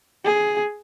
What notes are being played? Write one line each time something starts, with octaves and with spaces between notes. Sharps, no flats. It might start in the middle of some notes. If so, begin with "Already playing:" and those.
G#4